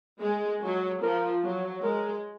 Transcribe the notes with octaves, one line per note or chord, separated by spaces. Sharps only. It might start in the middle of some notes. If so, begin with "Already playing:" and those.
G#3 G#4
F#3
F3 A#4
F#3
G#3 A#4